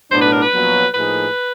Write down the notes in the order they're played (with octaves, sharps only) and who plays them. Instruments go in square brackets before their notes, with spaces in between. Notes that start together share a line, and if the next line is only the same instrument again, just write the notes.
[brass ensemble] B1 A2 F#3 B3 D4 [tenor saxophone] C5
[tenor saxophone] B4
A#4
B4
[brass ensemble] A#1 A#2 F#3 B3
[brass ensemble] A2 F3 A#3 D#4 G#4 [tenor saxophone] B4